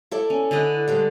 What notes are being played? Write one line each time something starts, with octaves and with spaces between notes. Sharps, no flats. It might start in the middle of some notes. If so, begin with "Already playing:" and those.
E4 A4 D5
C#4
D3 B4 D#5
G3 G#3 A4